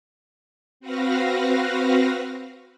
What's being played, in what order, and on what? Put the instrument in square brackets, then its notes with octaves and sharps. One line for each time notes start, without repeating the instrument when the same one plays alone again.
[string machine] C4 F#4 B4 F5 A#6